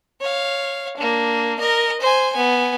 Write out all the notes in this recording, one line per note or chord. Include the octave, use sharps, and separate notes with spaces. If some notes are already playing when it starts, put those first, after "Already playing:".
C#5 F5
A#3 D4
A#4 D#5
C5 G#5
B3 G#5